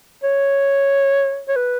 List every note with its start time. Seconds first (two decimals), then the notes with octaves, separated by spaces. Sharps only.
0.24 C#5
1.48 C#5
1.56 B4